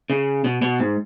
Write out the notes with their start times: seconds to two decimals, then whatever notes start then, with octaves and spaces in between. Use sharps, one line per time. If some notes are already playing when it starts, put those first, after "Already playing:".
0.10 C#3
0.44 B2
0.62 B2
0.80 G#2